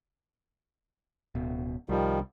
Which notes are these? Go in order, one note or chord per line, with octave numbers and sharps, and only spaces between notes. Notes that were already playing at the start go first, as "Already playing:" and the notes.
D1 B2
C2 D#3 F3 G3